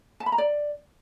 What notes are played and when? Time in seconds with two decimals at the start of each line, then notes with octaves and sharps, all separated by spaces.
0.20 A5
0.26 B5
0.32 A#5
0.38 D5